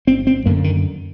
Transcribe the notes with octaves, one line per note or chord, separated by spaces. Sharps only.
G1 C4
C4
F#2 D3 A#3
D#3